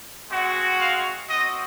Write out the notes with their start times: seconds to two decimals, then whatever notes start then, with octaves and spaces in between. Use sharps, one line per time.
0.30 G#3 C4 F#4
0.80 F5
1.29 C4 F#4 D#5